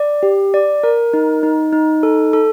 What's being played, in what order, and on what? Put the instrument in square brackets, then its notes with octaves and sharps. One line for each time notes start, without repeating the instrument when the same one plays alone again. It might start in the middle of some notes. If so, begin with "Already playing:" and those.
Already playing: [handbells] D5
G4
D5
A#4
D#4
D#4
D#4
A4
A4